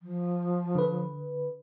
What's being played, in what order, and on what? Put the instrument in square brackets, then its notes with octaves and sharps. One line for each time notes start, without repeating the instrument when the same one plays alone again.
[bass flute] F3
[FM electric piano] D3 B4